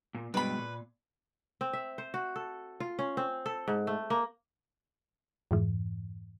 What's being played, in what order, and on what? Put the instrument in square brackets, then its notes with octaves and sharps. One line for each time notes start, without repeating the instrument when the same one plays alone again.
[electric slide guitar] A#2
[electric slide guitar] G2 B2 G#3 [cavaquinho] B4 B5
[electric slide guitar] A#2
[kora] C4
E5
C5
F#4
A4
F4
C#4
C4
A4
G#2
A3
A#3
[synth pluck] F2 G#2 E3